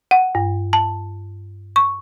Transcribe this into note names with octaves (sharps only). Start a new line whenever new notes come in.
F#5
G2
A5
C#6